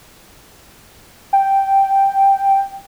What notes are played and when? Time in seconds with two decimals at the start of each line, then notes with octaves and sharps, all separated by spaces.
1.33 G5